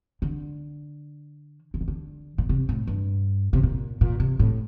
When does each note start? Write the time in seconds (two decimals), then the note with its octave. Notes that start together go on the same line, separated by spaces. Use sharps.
0.22 D3
1.74 D3
1.81 D#3
1.88 D3
2.38 A#2
2.49 C3
2.69 A2
2.87 G2
3.53 C3
3.63 A#2
4.01 A#2
4.20 C3
4.39 A2